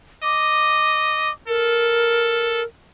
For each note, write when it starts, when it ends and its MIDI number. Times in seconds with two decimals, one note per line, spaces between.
0.23 1.31 75
0.23 1.30 86
1.48 2.61 69
1.48 2.64 70